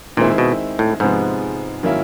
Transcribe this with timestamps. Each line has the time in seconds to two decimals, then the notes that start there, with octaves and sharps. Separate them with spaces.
0.17 A#2 D#3 G#3 C4 E4
0.38 B2
0.79 A2
1.00 G#2 C3 F3 G#3 B3
1.83 D#3 F#3 A#3 C#4 E4